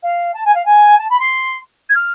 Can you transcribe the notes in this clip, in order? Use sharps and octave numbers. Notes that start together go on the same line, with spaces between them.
F5
A5
G#5
F5
G#5
A5
B5
C6
G#6
F6